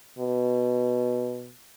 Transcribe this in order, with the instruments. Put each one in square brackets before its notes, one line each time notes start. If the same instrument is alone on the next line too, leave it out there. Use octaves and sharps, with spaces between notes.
[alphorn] B2